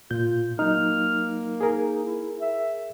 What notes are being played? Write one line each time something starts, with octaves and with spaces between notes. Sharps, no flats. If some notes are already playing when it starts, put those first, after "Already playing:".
A#2 F4 G6
F#3 A#3 D#4 F6
D#4 G#4 A#4
E4
E5